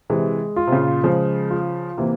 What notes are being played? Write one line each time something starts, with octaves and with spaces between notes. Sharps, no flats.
C3 E3 G#3
F4
C3
A#2 C#3
C#3 F3 G#3
F4
C3 E3 A#3